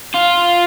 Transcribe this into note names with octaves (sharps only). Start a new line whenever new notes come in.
F4